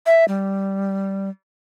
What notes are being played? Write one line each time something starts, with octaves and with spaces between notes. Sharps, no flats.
E5
G3